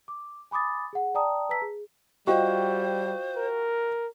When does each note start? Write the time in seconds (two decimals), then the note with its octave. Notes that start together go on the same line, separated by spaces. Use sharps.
0.08 D6
0.51 G#5 B5 D6 D#6 A6
0.93 G#4 F#5
1.15 D5 G5 A5 A#5 D#6
1.49 B4 A5 A#5 E6 B6
1.62 G#4
2.27 G3 F4 F#4 C5 D#5 F5 G5 C#6
3.37 A#4